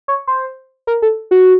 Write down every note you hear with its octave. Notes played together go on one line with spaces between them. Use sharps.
C#5
C5
A#4
A4
F#4